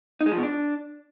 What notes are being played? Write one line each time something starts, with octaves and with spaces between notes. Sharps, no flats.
D#4
G#3
F3
B2
D4